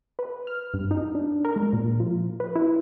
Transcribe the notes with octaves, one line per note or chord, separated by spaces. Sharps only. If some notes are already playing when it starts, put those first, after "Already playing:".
B4
F6
G2
D#4
D4
A#4
G#3
A#2
F3
B4
E4